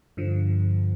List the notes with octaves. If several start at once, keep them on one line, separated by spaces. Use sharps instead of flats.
G2 D3 F3